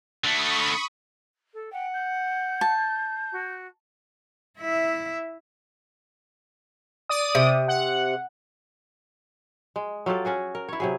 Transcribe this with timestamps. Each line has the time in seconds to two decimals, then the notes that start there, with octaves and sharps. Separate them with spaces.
0.24 D3 A3 B5 C#6 D#6
1.53 A4
1.72 F#5 G5
1.94 G6
2.61 A5
3.31 F#4
4.59 E4 E5
7.09 D5 D#6
7.35 C3
7.68 F#5
9.76 G#3
10.06 F#3 F4 G4 A4
10.25 C#4 F#4 G#4
10.55 A#4
10.69 E4 C#5
10.80 C3 F#3 G#4